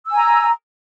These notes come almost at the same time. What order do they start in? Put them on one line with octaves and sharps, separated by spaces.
E6 G#5 A#5